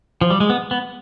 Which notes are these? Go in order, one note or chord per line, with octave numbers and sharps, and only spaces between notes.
F3
G3
G#3
B3
B3